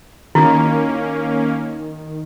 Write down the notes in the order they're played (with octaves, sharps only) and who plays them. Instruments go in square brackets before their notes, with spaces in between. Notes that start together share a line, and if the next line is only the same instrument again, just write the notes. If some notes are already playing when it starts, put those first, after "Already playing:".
[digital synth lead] D#3 [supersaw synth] A#3 C#4 [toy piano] E4 F#4